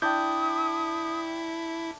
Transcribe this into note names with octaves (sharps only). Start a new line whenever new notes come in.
D4 E4 G5 D#6 G6